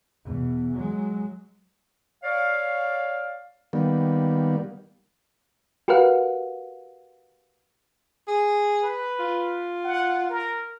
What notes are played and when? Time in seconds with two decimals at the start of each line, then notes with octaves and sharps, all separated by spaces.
0.24 E2 B2
0.74 F#3 G#3
2.24 C#5 D5 F5
3.73 D#3 G3 A#3 B3
5.88 F#4 G4 A#4 B4 F5 F#5
8.28 G#4
8.83 B4
9.20 F4
9.84 F#5
10.29 A#4